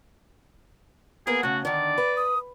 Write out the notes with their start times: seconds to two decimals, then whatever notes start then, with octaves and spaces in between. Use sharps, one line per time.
1.27 A#3 B3 G#4 A#4
1.43 C#3 A3 F#4
1.65 D3 D#3 D5
1.98 B4
2.17 D#6